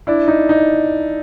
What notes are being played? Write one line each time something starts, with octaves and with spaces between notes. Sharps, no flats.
D4 E4
D#4
D#4